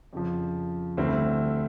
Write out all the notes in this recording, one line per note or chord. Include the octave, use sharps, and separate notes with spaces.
F2 C#3 F3
D2 D3 G3 C4 E4